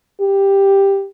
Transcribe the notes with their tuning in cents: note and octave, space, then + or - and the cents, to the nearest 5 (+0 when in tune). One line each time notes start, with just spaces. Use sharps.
G4 +5